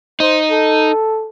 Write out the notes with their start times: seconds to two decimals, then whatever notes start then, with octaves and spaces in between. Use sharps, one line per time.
0.20 D#4 C5
0.50 A4